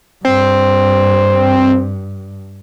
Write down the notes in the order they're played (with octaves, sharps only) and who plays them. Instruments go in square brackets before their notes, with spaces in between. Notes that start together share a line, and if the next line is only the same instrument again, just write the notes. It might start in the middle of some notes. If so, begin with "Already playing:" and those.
[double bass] G2 [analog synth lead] C4